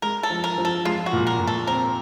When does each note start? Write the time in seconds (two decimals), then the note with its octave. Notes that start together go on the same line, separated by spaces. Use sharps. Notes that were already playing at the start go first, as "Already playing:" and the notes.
0.02 G#3 A#4
0.23 A4
0.30 F3
0.44 A#4
0.58 F3
0.65 A4
0.85 G#3 F4
1.06 F#4
1.13 A#2
1.27 A#4
1.40 A#2
1.47 A4
1.67 C4 A#4